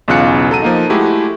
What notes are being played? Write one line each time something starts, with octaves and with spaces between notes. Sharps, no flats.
B1 E2 C#3 F4 F#6 C#7
F#3 A4 A#5 D#7
F3 A#3 D#4
G#3 A3 E4 F#4 G4